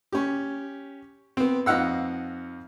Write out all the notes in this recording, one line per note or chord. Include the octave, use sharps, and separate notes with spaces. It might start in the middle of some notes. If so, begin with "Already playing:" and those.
C#4 G4
B3 C4
F2 D#4 F5 F#5 E6